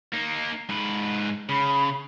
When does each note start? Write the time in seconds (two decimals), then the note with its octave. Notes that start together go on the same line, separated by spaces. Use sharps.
0.13 A#3 D#4
0.69 G#2 B4
1.49 C#3 B5